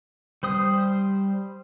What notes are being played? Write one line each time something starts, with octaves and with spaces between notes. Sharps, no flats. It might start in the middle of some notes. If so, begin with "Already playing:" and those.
G3 C5 D#6